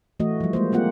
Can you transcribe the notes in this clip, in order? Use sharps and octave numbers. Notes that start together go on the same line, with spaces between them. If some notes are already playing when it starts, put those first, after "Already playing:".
E3 A3 F#4 D#5
F3 G3
G#3 A#3 C5
G3 A#3 C4 F4 G4 F#5